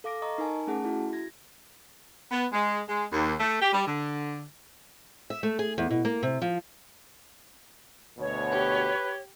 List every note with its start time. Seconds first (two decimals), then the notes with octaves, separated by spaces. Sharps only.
0.04 A4 F5 D6 A#6 D7
0.22 D#5 A#5 C#6 D#6
0.38 D#4 A#4 G#5 A5
0.67 A3 C#4 G#4 F#5 A5
0.84 E4 F#4
1.13 G#6 A#6
2.31 B3
2.52 G#3
2.88 G#3
3.11 D#2
3.40 A3
3.61 G4
3.72 G3
3.86 D3
5.30 E5
5.43 A3
5.59 G#4
5.78 E2
5.90 B2
6.05 A#3
6.23 C3
6.42 F3
8.19 D2 B2 C#5
8.52 G4 B4